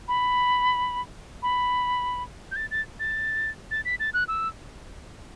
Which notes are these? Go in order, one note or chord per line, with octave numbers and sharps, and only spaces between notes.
B5
B5
G6
A6
A6
A6
A6
B6
A6
F#6
E6